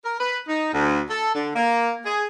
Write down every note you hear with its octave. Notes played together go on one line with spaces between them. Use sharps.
A#4
B4
D#4
D2
A4
D3
A#3
G#4